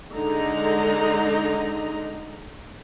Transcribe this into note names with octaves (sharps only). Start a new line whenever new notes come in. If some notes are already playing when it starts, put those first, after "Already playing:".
D3 G#3 D#4 A#5